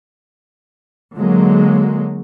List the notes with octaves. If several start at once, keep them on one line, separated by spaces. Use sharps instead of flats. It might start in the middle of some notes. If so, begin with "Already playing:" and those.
D3 F#3 G#3 A#3